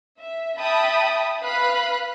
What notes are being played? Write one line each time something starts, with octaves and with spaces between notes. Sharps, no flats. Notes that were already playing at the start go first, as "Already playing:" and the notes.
E5
E5 G5 A5 B5 D#6
B4 F5 B5 F#6